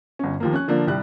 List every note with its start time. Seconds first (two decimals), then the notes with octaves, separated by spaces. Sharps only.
0.19 G1 C#4
0.40 D#2 F3 A#3
0.53 C#4 F#6
0.68 D3 F3 A#3 D4
0.87 C2 G3 F#6